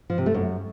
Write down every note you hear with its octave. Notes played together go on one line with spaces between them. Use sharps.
F3
C3
A3
F#2